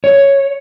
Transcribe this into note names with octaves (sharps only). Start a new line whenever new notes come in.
C#5